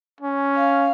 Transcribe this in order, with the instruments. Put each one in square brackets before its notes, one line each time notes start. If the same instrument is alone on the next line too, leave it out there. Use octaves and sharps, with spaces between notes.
[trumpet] C#4
[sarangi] F5